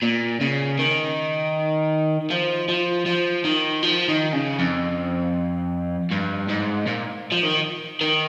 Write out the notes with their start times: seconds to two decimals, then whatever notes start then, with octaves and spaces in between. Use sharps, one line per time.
0.03 A#2
0.41 C#3
0.79 D#3
2.31 F3
2.69 F3
3.06 F3
3.45 D#3
3.83 F3
4.08 D#3
4.33 C#3
4.59 F2
6.11 G2
6.48 G#2
6.86 A#2
7.32 F3
7.44 D#3
8.01 D#3